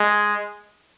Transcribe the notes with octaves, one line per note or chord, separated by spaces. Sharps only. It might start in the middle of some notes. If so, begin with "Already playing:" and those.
Already playing: G#3